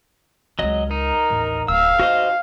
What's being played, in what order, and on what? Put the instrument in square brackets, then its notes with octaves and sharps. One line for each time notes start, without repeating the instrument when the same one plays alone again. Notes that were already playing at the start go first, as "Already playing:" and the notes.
[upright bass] C#2 C4 [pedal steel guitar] F#3 D#5
[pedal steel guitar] D#4 [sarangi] A#4
[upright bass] A1 D#2
[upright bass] D1 F4 [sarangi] F5 [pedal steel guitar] E6
[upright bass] D#4 [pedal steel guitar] F#4 C5 D#5